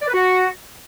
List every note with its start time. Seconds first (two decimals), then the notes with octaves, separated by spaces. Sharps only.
0.02 D5
0.08 B4
0.14 F#4